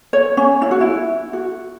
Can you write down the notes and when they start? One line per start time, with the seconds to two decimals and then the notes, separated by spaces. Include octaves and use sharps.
0.13 C#5
0.37 C#4
0.62 E4
0.71 F#4
0.81 E4
1.33 F#4